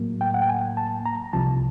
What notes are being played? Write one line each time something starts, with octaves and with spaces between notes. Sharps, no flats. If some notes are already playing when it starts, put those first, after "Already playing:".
Already playing: A2 F#3 A#3
G5
F#5
G5
G#5
A5
A#5
C2 C3 F3 A5